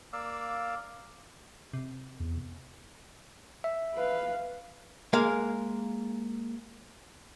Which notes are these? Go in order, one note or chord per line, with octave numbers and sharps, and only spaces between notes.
A#3 D5 F5 E6
C3
E2
E5
B4 F5
G#3 A#3 A#4 F5